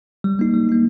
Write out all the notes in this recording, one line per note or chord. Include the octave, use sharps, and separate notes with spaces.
G3
A#3 D#4
G3
A#3 D#4